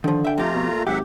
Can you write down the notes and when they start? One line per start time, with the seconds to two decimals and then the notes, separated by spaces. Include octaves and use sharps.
0.04 D3 D#3 F3
0.24 E5 G5
0.38 F2 A3 F4 G4 A#5
0.54 B2
0.71 A#2
0.87 G#1 F#3 G4 E5 F#5